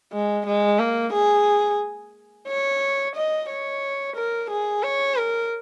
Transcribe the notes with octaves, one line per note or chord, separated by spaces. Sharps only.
G#3
G#3
A#3
G#4
C#5
D#5
C#5
A#4
G#4
C#5
A#4